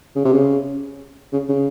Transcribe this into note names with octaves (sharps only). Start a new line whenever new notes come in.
C#3
C3
C#3
C#3
C#3